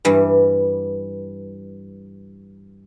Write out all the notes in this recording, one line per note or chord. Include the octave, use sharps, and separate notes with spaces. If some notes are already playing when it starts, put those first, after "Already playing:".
G2 E3 G3